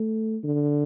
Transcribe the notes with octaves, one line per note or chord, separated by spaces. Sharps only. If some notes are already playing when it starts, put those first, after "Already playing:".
Already playing: A3
D3